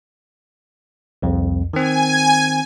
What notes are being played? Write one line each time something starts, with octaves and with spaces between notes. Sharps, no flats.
C2 F2
D#3 C4 G#5